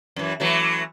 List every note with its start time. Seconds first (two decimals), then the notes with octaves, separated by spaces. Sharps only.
0.16 F#2 E3
0.40 E3 F#3 A3